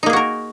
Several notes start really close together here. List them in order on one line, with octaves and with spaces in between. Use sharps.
D#4 A#3 G#4 F#4 A#4